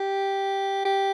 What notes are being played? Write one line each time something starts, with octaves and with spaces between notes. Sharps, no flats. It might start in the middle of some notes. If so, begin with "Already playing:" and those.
Already playing: G4
G4